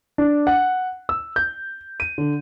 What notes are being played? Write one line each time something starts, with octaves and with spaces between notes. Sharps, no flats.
D4
F#5
E6
G6
D#7
D3